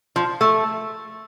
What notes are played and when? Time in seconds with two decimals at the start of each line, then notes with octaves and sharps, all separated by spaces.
0.16 F3
0.41 A3